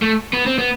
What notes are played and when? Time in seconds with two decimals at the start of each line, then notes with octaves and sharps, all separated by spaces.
0.02 A3
0.33 B3
0.46 C4
0.58 B3